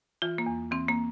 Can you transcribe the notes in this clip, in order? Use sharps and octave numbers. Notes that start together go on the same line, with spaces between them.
E3 F4
A#3
E2
E3 C4
A#3